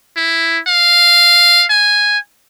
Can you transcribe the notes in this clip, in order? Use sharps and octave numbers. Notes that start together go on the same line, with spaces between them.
E4
F5
G#5